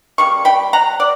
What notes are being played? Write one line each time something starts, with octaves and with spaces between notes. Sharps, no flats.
C#3 G3 A#3 C#6
G5 B5
F#5 A#5
D5 F#5